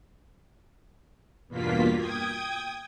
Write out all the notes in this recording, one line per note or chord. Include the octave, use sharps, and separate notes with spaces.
E2 G2 B2 A#3 F4 B6
G5 D#6 G#6